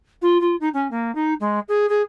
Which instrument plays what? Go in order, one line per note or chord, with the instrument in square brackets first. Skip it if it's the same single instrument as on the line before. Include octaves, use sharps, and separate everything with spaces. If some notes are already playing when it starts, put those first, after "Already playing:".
[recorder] F4
F4
D#4
C#4
A#3
D#4
G#3
G#4
G#4